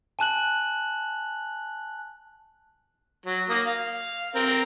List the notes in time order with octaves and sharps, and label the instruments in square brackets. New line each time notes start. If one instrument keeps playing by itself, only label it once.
[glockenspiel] G#5 A5 F#6 F#7
[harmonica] F#3
A#3 D#6
F5
C4 A#4